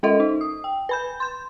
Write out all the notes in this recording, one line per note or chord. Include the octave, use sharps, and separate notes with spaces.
G#3 C#4 A4 D#5 E5
D#4
D#6
G5
B4 B5 G6
C6 G6